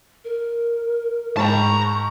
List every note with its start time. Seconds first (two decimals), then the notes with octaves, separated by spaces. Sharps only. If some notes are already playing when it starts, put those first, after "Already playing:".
0.25 A#4
1.37 G#2 G5 A5 A#5 C#6